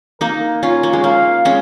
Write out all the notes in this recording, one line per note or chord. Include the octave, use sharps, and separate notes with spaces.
A#3 D#4 A#4
C#4 F4 C#5
A#3
G#3
A#3 F5
G#3 C#4